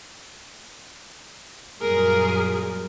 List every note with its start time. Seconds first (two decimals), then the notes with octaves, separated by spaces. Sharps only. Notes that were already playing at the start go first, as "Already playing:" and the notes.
1.81 F#2 A#2 G3 G#4 A#4